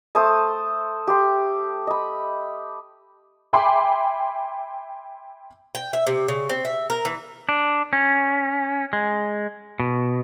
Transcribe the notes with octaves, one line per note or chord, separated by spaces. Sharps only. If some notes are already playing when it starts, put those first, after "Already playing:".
A3 C5 A5 D#6
G4 C6
D#5 B5
E5 G5 G#5 B5 C6 D6
G5
E5
C3
C#3
C4
E5
A#4
E3
D4
C#4
G#3
B2